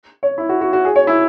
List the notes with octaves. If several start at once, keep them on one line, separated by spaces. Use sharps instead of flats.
C#5
E4
F#4
F#4
F#4
G#4
C#5
E4